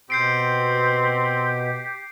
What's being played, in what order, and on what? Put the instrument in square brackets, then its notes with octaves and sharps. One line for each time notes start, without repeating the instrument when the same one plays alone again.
[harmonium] B2 [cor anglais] C4 [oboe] G4 [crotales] G6 C7 D7